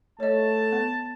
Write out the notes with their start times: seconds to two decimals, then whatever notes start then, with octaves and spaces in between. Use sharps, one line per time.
0.20 A3 C#5 D#5 A5
0.72 B3